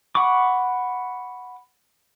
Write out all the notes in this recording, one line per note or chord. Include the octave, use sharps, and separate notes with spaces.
F#5 B5 C#6 D6